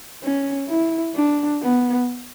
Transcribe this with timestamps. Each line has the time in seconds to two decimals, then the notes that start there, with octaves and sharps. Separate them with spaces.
0.23 C#4
0.69 E4
1.15 D4
1.62 B3